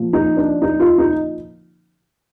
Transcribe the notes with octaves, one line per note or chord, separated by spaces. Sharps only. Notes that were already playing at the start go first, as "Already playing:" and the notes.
Already playing: A#2 F3
D#4
D4
D#4
F4
D#4